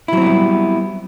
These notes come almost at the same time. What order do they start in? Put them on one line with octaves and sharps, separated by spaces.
E4 F#3 C4 B3 G3